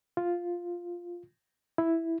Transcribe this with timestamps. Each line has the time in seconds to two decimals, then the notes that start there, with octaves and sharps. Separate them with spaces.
0.17 F4
1.78 E4